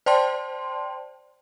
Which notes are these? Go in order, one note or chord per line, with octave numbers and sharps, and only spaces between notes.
C5 D5 G5 A5 C6